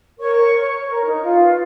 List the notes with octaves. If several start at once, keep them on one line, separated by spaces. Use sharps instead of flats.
A#4 C#5 C#6
C#5
C#5
C#5
A#4
D#4
F4
B4